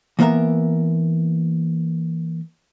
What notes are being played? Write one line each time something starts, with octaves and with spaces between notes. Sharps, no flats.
E3 A#3 B3 A#4 E5